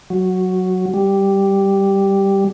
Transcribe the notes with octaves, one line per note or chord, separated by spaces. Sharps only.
F#3
G3